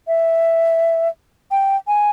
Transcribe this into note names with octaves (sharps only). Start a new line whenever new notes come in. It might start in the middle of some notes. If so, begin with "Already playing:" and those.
E5
G5
G#5